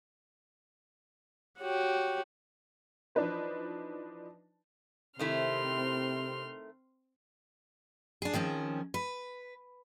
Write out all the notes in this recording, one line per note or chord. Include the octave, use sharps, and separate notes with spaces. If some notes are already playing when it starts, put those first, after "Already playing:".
F#4 G4 C#5
E3 F3 D4 D#4 B4 C5
C3 D#3 A3 C4 E4 C6 F6
D4 G#4
D#3 F3 C4 C#4
B4